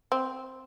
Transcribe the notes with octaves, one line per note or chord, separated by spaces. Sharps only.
C4